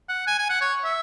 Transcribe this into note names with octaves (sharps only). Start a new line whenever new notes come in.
F#5
G#5
G#5
F#5
C#5
E5